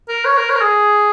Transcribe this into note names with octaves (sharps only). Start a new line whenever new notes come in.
A#4
C#5
A#4
C#5
A#4
G#4